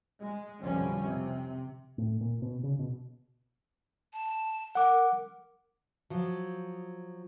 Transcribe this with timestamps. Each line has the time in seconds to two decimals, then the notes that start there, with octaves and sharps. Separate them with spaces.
0.23 G#3
0.61 F1 B1 D3 F3 G3 C#4
1.03 C3
1.98 A2
2.21 A#2
2.42 B2
2.63 C#3
2.79 B2
4.13 A5
4.75 A#4 F#5 D6
6.10 F3 F#3